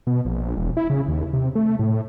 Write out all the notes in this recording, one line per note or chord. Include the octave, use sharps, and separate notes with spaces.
B2
A#1
E1
E4
C#3
D#2
C3
A3
A2